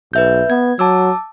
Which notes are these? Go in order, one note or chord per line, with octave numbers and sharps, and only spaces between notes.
B1 B4 E5 G6
B3 G#6
F#3 A5 D6 E6